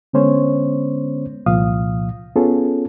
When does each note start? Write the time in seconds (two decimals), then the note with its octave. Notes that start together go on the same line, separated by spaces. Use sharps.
0.13 D3 G#3 B3 C#4 C5 C#5
1.46 C2 A#2 F3 F5 D#6
2.36 B3 C#4 F4 G#4 A4